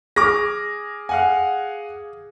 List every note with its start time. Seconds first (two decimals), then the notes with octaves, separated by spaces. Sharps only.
0.16 G#4 D6 F6 A#6
1.09 F5 F#5 G#5